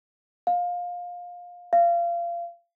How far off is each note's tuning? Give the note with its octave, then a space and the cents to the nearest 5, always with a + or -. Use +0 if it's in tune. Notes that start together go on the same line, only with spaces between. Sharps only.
F5 +20
F5 -25